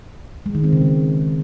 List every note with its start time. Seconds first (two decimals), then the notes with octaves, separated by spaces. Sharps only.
0.46 G#3
0.55 D#3
0.64 C4
0.73 C#3
0.82 G#3